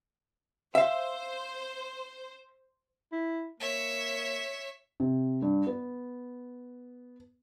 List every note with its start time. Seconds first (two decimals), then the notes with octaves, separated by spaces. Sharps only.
0.75 C5 E5 F5
3.12 E4
3.61 A#3 C#5 E5
5.00 C3
5.42 G2
5.67 B3